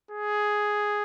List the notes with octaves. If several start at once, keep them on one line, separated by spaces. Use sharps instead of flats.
G#4